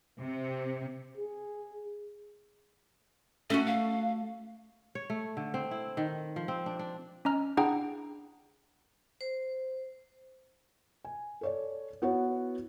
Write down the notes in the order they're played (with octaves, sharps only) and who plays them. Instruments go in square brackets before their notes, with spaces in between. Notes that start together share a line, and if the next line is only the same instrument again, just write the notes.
[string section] C3
[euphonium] G#4
[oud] A3 F#4 [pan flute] C#4
[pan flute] F5
[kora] C#5
A3
D3
C4
E4
D#3
F3
C4
D4
D4
[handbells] C#4 D#5 A#5 F6
D4 E4 G#4 F#5 G5 A#5
[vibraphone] C5
[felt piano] G#5
A4 C#5 D5
B3 E4 F#4 B4 C#5 F#5